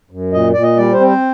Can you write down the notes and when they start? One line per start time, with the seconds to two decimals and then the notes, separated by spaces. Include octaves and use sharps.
0.11 F#2
0.33 A#2 D#5
0.53 A#2 D5
0.62 D#5
0.77 G3 D5
0.93 C5
1.00 C4
1.07 C5